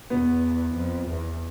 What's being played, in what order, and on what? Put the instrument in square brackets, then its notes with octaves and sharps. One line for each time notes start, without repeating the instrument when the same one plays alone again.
[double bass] E2 [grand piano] B3
[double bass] F2
E2